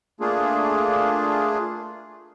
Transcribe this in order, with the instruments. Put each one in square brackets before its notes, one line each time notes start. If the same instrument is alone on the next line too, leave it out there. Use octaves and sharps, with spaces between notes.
[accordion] A3 A#3 D4 F4 G#4